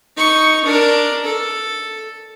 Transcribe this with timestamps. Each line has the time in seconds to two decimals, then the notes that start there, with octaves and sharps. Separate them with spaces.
0.16 D#4 C#6
0.64 D4 A#4
1.24 A4